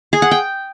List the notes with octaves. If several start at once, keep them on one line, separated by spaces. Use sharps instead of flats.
G#4
F#5
G5